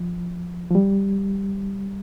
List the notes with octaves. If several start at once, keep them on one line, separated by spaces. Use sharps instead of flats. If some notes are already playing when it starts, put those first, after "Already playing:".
Already playing: F3
F3
G3